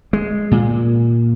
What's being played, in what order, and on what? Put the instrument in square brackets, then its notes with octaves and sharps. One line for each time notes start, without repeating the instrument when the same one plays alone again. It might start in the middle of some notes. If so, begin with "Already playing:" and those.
[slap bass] G#3
A#2